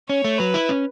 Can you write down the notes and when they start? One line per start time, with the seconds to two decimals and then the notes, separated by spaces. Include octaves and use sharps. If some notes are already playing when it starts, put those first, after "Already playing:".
0.09 C#4 C#5
0.24 A3
0.39 F#3 B4
0.54 E4
0.69 C#4